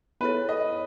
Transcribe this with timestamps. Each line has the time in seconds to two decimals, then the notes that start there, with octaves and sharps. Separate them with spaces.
0.21 B3 E4 A4 B4 C#5
0.49 D#5